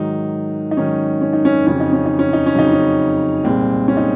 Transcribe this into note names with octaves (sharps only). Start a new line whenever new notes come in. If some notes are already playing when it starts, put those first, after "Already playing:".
Already playing: G#2 D#3 F#3 D#4
D#4
G#2 D#3 F#3 C#4
C#4
D#4
C#4
F2 C#3 F#3 C#4
D#4
C#4
D#4
C#4
D#4
C#4
F2 C#3 F#3 D#4
C#4
C2 A#2 G#3 C4
C#4
D#4